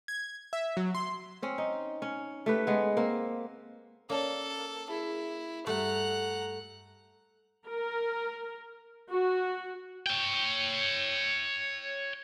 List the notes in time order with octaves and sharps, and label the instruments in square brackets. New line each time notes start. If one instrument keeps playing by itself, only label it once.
[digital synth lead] G#6
E5
F#3
C6
[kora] C4 C#4
D#4
C#4
A3 G4 B4
G#3 B3
A#3 C4
[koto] A#3 [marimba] C#4 C#5 D5 [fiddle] A4
[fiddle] E4 [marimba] G#4
[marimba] G2 G3 G4 [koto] A3 [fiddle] F#5 A#5
[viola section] A#4
F#4
[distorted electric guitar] C#5 G5